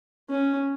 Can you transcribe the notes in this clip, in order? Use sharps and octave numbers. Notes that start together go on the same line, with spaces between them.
C#4